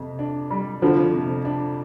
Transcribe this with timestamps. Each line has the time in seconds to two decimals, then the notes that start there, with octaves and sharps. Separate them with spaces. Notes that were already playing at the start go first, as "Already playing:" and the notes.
Already playing: F2 C3
0.19 D4
0.51 G3
0.82 F2 D3 F3
1.14 C3
1.45 D4